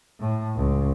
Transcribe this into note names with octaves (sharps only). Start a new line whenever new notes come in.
A2
C#2